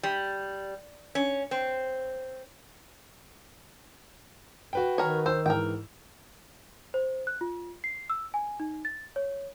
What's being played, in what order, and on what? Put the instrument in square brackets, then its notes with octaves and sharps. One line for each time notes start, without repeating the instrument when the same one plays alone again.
[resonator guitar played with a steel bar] G3
C#4
C4
[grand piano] F#4 B4 G5
[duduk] D#3 [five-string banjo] A#4 C#5
[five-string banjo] C5 [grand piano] E6
[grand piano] G#2 E3 [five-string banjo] A#4 G5
[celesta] C5
F#6
F4
C7
E6
G#5
D#4
A6
C#5